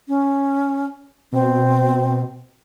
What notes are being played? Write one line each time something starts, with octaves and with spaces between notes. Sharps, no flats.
C#4
B2 C4